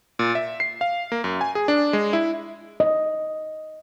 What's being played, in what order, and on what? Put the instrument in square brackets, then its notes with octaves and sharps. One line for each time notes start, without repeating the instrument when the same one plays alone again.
[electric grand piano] A#2
E5
C7
F5
A#3
F#2
G#5
G#4
D4
G#3
E4
[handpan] D#5